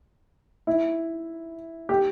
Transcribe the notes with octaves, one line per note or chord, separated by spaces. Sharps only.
E4
G4